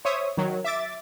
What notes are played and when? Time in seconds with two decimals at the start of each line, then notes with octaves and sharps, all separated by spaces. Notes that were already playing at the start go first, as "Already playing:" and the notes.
0.05 C5 C#5 E5 D#6
0.37 D#3 F#3
0.64 E5 D6 A6